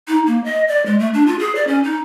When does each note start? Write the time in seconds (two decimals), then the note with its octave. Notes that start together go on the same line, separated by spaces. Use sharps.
0.08 D#4
0.27 A#3
0.44 D#5
0.68 D5
0.86 G#3
0.99 A3
1.14 D4
1.27 F4
1.39 G#4
1.55 D5
1.68 C#4
1.84 D#4